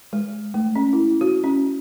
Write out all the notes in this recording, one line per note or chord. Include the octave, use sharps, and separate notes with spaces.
G#3
A3
C#4
E4
F#4
C#4